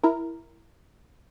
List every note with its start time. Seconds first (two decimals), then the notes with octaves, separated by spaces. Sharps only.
0.04 E4 A#4